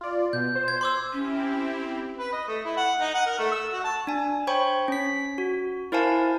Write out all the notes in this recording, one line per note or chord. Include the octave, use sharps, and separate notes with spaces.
F4 D5
B2 G6
C5
G#6
C6 D6 E6
C4 C#4 E4 G4
B4
D#5
A3
E4
F#5
D#4
F#5
A#4
A3
E6
F#4
A5
D4 G#5
C5 C#5 G5 B5 C#6
C#4 B6
F#4
E4 A#4 C5 F5 G#5 A5